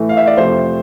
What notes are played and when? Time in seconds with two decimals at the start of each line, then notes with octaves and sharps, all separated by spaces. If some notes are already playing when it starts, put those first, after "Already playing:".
Already playing: A2 E3 A3
0.09 F5
0.17 E5
0.27 D5
0.37 F2 C3 F3 A3 C5